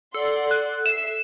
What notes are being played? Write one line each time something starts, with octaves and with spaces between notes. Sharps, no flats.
A4 D5 F#5 C6
F#6
E5 C7 E7